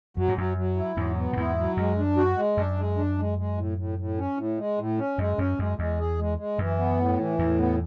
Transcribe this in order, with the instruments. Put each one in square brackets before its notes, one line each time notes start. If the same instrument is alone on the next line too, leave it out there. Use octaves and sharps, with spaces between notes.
[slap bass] F#2 [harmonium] F#3
[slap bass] G#2
[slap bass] F#2 [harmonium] F#3
[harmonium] F#3
E4
[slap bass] E2 G#2 [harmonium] F#3
[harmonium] B3
[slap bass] A2
[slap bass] E2 G#2 [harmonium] E4
[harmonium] F#3
[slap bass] F#2 [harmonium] G#3
[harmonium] D4
F#4
G#3
[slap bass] F#2 [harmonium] D4
[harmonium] G#3
D4
G#3
G#3
A2
A2
A2
C#4
A2
G#3
A2
C#4
[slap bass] F#2 [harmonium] G#3
[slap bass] F#2 [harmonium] C#4
[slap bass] F#2 [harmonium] G#3
[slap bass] E2 [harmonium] G#3
[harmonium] G#4
G#3
G#3
[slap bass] F#2 [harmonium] E3
[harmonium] B3
A2
E3
[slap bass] E2 [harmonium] A2
[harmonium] B3